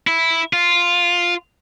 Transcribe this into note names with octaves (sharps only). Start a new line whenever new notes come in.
E4
F4